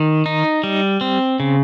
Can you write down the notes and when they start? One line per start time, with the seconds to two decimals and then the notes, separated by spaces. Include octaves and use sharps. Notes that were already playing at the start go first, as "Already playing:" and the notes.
Already playing: D#3
0.26 D#4
0.63 G3
1.01 C4
1.40 C#3